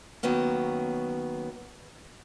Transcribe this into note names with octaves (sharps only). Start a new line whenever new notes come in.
D#3 F#3 A#3 B3 C#4